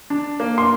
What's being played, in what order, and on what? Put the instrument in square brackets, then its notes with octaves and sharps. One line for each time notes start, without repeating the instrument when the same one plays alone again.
[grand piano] D4
A#3
[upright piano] C6